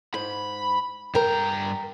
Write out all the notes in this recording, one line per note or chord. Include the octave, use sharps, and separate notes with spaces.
G#2 B5
G2 A#4 G5 A#5